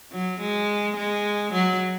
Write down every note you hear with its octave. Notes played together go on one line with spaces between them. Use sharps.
F#3
G#3
G#3
F#3